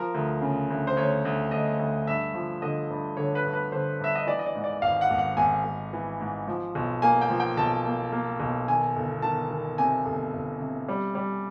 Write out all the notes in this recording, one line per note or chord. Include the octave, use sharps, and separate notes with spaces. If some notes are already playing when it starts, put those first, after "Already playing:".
Already playing: F3 A#4
D2
C#3
D2
C5
D2 C#5
D2
D2 D#5
D2
G2 E5
F3
D3 D#5
G2
D3 C#5
B4
G2
B4
D3 C5
G2 E5
D#5
E3 D5
D#5
D5
G#2
D5
G#1 F5
F#5
G#1
F#5
G#1 G#5
G#1
E3
G#2
F3
B1
A#3 G#5
G5
F3
G5
B1 A5
A#3
A#3
B1
D#3 G#5
G1
D#3 A5
D#3
C3 G#5
G1
G1
C3
G3
G3